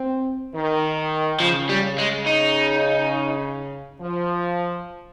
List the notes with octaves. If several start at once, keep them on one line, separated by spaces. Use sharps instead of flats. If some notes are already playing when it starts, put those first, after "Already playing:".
Already playing: C4
D#3
C#3 F3
G3
C#3
G#3
D#4
F3